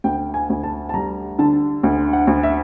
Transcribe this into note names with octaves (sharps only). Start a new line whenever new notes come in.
D2 G5
G#5
D2
A5
A5
G3 A#5
D3 A5
D2
F#5
D2
E5